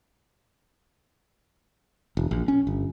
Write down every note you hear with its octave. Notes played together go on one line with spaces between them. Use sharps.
E1
A#1
C#4
G1